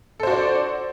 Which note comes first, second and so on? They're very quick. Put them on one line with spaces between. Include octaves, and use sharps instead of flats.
A4 C5 F#4 D5